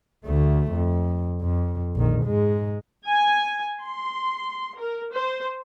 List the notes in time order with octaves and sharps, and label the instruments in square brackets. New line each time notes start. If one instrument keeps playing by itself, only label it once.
[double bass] D2 A3
F2
F2
A#1 D#3
G#2 G#3
[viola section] G#5
C6
A#4
C5